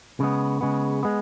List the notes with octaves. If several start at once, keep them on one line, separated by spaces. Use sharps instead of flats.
C#3 G#3 B3
C#3 G#3 B3
G#3 B3